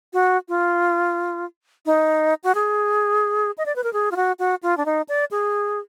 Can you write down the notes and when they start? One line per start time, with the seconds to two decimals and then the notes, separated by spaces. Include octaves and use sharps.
0.13 F#4
0.49 F4
1.86 D#4
2.44 F#4
2.55 G#4
3.58 D#5
3.66 D5
3.76 B4
3.84 A#4
3.93 G#4
4.11 F4
4.16 F#4
4.39 F#4
4.63 F4
4.77 D4
4.86 D#4
5.09 D5
5.31 G#4